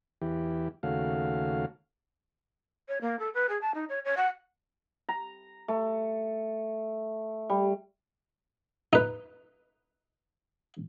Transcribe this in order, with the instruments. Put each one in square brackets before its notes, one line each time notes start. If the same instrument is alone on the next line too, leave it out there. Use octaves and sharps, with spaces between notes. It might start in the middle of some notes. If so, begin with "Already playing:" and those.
[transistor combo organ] E2 E3 G4
D#2 C#3 A3 F#4 F5
[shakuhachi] C#5
A#3
A4
B4
G#4
A5
D#4
C#5
C#5
F#5
[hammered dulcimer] A#5
A3
G3
[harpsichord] D#4 B4